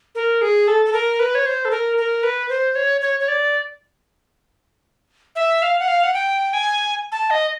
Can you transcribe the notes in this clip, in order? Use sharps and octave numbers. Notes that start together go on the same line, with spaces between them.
A#4
G#4
A4
A4
A#4
B4
C#5
C5
A4
A#4
A#4
B4
C5
C#5
C#5
C#5
D5
E5
F5
F#5
F5
F#5
G5
G#5
A5
D#5